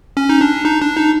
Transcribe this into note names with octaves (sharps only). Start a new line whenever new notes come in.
C#4
D#4
D4
D#4
D4
D#4